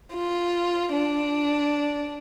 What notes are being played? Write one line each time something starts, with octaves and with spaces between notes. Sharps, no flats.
F4
D4